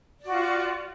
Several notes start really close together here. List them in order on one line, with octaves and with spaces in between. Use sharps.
D5 F#4 F4